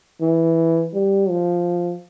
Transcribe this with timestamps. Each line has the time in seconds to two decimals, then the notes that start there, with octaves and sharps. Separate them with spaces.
0.21 E3
0.94 G3
1.29 F3